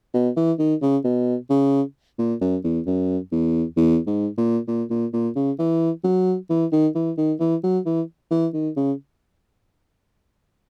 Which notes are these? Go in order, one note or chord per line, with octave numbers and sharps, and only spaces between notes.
B2
E3
D#3
C#3
B2
C#3
A#2
F#2
E2
F#2
E2
E2
G#2
A#2
A#2
A#2
A#2
C#3
E3
F#3
E3
D#3
E3
D#3
E3
F#3
E3
E3
D#3
C#3